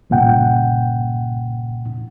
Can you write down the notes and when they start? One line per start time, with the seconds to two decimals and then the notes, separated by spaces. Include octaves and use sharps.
0.10 C2 G2 A#2 C#3 F#5 G5